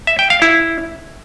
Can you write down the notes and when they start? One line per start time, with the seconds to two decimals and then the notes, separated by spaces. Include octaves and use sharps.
0.07 E5
0.19 G5
0.30 F5
0.42 E4